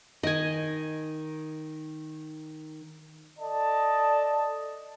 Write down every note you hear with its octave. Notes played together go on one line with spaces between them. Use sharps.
D#3 D#5 G#5
A4 D5 D#5 A5